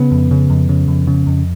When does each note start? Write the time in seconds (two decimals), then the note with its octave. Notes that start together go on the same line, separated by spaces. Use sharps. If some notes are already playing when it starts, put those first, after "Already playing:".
Already playing: C#3 B3
0.12 F2
0.31 C#3
0.50 F2
0.69 C#3
0.88 F2
1.07 C#3
1.27 F2